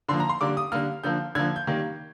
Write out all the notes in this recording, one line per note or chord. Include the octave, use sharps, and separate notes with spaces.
D3 F3 A#3 C6
A#5
C6
D3 G3 A#3 D6
D#6
D3 G3 A#3 F6
D3 F3 A#3 G6
D3 F3 A#3 G#6
G6
D#3 G3 A#3